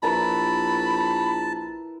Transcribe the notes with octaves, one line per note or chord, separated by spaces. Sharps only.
A#1 E4 A#4 B4 A5 B5